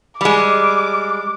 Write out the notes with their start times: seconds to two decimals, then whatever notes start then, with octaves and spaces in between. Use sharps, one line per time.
0.21 G3 G#3 D6